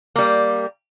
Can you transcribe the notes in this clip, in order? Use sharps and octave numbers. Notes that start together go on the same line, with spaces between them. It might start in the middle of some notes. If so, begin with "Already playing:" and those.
G3 A#3